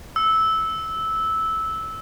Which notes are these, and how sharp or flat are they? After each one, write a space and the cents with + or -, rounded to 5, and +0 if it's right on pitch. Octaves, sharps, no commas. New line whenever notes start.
E6 -10